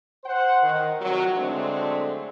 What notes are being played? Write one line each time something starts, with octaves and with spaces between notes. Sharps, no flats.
C5 F#5
D#3
F2 C3 D#3 F#3
D3 F#3 G#3 A3 C4 D4